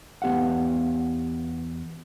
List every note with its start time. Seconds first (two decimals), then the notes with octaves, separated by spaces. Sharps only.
0.22 E2 B3 G4 F5 F#5